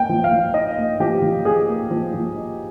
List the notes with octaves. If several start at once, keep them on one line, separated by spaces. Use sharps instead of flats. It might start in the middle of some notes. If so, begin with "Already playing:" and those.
Already playing: A#3 D#4 G5
F3
F5
F3
D#4 D#5
A#3
F3 G4
F3
D#4 G#4
A#3
F3
F3
D#4